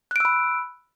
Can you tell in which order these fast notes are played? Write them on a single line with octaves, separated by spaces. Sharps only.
F#6 D7 E6 B5